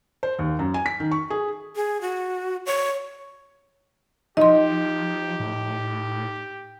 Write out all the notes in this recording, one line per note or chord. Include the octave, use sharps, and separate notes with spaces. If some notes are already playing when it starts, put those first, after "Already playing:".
C5
D#2
F#2
G#5
B6
D#3
C#6
G#4
G#4
F#4
C#5
F3 D#4 G4 D#5 C6
A2